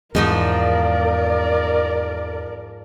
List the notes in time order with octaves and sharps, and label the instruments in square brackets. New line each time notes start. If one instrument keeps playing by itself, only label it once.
[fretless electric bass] E2 G#3 [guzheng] G#2 F3 D#4 [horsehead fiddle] A#4 D5